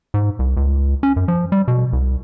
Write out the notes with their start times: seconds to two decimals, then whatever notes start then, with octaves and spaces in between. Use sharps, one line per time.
0.14 G#2
0.39 C2
0.57 C#2
1.03 C#4
1.16 F#2
1.28 F3
1.52 G3
1.68 B2
1.93 C2